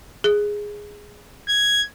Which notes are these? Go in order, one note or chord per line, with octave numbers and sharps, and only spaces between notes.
G#4
G#6